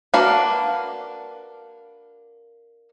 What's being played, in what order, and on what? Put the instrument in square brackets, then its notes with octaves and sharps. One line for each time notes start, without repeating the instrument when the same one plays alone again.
[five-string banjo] A#3 D4 F#4 B4 F5